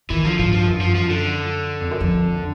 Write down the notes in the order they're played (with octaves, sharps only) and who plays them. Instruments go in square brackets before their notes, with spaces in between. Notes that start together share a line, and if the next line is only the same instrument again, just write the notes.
[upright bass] D#3 [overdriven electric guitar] E3
[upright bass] D3 [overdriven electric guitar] F3
[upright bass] G#2 [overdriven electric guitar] F3
[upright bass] G2 [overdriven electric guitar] F3
[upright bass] F#2
[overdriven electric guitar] F3
F3
D3
[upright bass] F2
F#2
F2